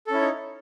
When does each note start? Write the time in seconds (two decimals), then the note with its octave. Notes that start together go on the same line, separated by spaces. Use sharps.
0.07 A4
0.11 C#4
0.14 E4
0.18 C#5
0.21 D#4